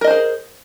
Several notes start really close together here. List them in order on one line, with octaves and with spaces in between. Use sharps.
A#4 D#5 C5 G#4